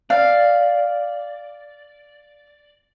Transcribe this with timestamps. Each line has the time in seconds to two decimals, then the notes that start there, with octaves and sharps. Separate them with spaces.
0.10 D5 F5